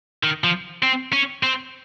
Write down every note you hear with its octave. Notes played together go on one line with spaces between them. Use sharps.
D#3
F3
C4
C#4
C4